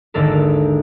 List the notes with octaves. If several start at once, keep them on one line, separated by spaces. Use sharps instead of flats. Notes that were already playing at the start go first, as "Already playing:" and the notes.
G#1 D#2 D3 A4 A#4